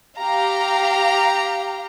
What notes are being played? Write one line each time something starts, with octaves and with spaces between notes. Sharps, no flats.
G4 F5 A#5